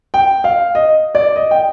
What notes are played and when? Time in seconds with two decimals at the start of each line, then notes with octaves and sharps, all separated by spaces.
0.14 G5
0.44 F5
0.75 D#5
1.15 D5
1.36 D#5
1.51 G5